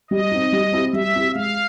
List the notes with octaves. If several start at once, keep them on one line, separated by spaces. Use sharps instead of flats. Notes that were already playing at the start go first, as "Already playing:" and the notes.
G3 D#5
C4 D#4
G3
C4 E4 G4
G3 E5
C4 E4 G4
G#3 F5